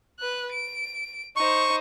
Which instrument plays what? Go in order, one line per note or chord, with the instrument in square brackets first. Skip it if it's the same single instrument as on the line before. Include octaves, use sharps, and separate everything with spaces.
[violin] B4 F#6
D7
[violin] D#4 C5 [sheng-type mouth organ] C#6